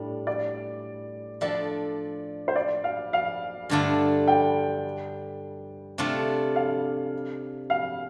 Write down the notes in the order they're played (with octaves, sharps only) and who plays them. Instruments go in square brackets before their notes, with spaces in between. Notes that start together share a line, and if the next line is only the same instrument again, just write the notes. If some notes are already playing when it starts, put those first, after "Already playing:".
Already playing: [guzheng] A2 G3 D4
[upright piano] D5
[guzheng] F3 D4 A4 [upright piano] D5
[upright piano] C5
D5
F5
F5
[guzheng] G2 D3 A3 D4 F4
[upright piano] G5
[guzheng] C3 A3 D4 F4
[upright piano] F5
F5